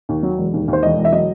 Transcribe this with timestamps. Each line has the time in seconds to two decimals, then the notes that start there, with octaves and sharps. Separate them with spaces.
0.09 D#2
0.23 F#3
0.38 E1
0.54 D#2
0.68 D#2
0.73 C5
0.83 E1 D#5
0.98 E1
1.05 E5
1.12 F#3 D#5